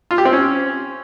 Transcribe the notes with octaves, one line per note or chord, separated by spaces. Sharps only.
F4
G4
C4
C#4